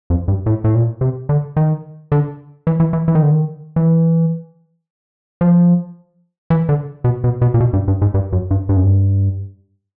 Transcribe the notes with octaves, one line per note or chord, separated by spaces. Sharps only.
F2
G2
A2
A2
A#2
C3
D3
D#3
D3
E3
E3
E3
E3
D#3
D3
D#3
E3
F3
E3
D3
B2
B2
B2
A#2
B2
G2
G2
G#2
G2
F#2
G2
G2
F#2
G2